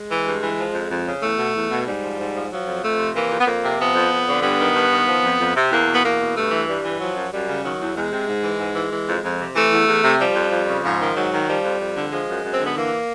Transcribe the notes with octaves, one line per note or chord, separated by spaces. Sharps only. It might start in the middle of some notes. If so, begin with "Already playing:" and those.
Already playing: G#3
E3
G2
E3
F3
F2
F2
C#3
E2 A3
B2
E2
B2
G#2 G3
F3
G#2
F3
F3 F#3
F2
F2 A3
C3
E3 A#3
F2
B3
F2 A#3
C3
F3 B3
F2
F2
D3
G2 B3
D#3
G2
D#3
F3
F2
F2
C3
E2 A#3
B2
B3
E2 A#3
B2
G2 A3
E3
G2 G3
E3
F3 F#3
F#2
F#2 G3
C#3
D#3 F#3
E2
E2 G#3
C3
G#2
E3
G#2
E3
E3
F2
F2
C3
E3 A3
E2
E2
C3
F3 G3
F2
F2
C#3
G#2 F3
D#3
G#2 F#3
D#3
F3 G3
F2
F2
D3
F3 G#3
F#2
F#2
C4
D3 B3
E3 A#3